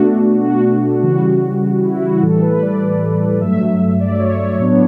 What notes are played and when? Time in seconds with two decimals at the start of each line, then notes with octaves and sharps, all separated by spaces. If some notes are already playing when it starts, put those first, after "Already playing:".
Already playing: B2 A3 D4 F#4
0.44 F#4
1.03 C#3 E3 G3 F#4
1.83 E4
2.02 F#4
2.22 A2 E3 G3 A4
2.41 B4
2.62 D5
3.41 G2 F#3 A3 E5
4.00 D5
4.19 C#5
4.39 C#5
4.60 A2 F#3 B3 D4